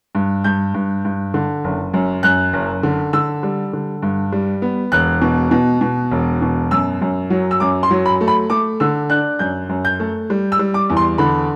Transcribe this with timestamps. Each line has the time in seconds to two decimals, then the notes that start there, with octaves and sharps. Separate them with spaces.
0.15 G2
0.44 G2 G6
0.74 G2
1.05 G2
1.34 D3
1.64 F#1
1.94 F#2
2.23 F#2 F#6
2.53 F#1
2.83 D3
3.13 D3 E6
3.43 G3
3.73 D3
4.02 G2
4.32 G3
4.62 B3
4.92 E1 F#6
5.22 B2
5.51 B2
5.81 B2
6.12 E1
6.42 B2
6.71 F#2 E6
7.01 F#2
7.30 F#3
7.51 E6
7.60 F#2 D6
7.83 C6
7.91 F#3
8.06 B5
8.21 A3
8.28 B5
8.50 A3 D6
8.80 D3 E6
9.10 D4 F#6
9.39 F#2 G6
9.69 F#2
9.85 G6
10.00 A3
10.30 G3
10.52 E6
10.59 G3
10.74 D6
10.90 E2
10.97 C6
11.18 D3 B5